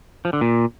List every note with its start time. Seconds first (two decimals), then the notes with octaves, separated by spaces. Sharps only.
0.25 F3
0.33 D3
0.41 A#2